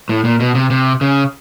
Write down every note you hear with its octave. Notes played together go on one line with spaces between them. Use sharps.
A2
A#2
B2
C3
C3
C#3